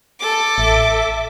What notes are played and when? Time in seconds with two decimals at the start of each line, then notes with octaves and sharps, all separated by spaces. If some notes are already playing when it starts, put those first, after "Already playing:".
0.20 A4 D6
0.58 A1 E5